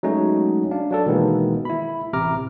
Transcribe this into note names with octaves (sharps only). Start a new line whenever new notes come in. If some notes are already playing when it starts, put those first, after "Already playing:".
F#3 G#3 A3 C#4 D#4
D4 F5
F#3 D4 A4
B2 D#3 E3 G#3 A#3
E4 B5
A1 C3 A#5 D6 F6